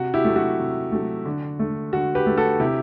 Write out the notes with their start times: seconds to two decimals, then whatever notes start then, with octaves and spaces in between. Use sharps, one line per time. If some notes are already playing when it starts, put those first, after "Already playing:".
Already playing: C3 F#4
0.14 E4 G4
0.25 F#3 A3
0.36 F#4
0.59 C3
0.92 F#3 A3
1.26 D3
1.60 A3
1.93 D3 F#4
2.15 G4 B4
2.27 A3
2.37 F#4 A4
2.60 C3 E4 G4